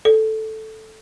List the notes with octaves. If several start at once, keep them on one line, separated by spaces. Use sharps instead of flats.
A4